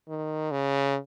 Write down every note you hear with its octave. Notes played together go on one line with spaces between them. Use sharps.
D#3
C#3